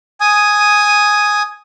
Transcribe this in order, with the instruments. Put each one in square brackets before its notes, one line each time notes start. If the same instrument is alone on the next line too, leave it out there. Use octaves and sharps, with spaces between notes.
[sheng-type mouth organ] G#5 D#6